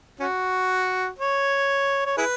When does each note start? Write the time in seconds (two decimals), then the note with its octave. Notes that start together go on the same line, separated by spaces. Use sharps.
0.20 C#4 F#4
1.19 C#5
2.06 C#5
2.17 E4 G#4 B4